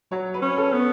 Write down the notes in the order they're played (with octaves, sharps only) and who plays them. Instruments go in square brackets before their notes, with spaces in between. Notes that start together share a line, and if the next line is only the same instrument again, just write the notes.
[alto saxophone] F#3 [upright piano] C#5
[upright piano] B4
[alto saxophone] C#4
[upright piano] A4
[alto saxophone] B3